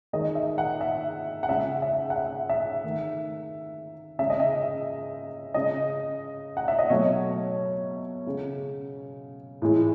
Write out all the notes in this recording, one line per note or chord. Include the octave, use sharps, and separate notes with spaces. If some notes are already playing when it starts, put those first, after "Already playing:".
D#3 G#3 D#5
E5
F#5
E5
F#5
C#3 G#3 E5
E5
F#5
E5
E5
D#3 A3
C#3 G#3 E5
D#5
E5
C#3 G#3 D#5
F#5
E5
D#5
B2 F#3 A3 C#5
C#3 G#3
A2 E3 G#3